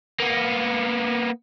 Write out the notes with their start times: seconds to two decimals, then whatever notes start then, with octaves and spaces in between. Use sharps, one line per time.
0.20 A#3 B3